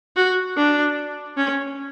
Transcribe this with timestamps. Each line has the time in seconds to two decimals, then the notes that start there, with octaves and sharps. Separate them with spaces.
0.16 F#4
0.57 D4
1.37 C#4